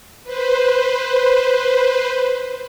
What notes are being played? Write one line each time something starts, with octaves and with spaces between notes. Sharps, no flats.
B4 C5